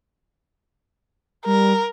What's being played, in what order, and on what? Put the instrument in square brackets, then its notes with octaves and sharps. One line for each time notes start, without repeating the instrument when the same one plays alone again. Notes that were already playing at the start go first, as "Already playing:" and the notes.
[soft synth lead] G3 [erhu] A#4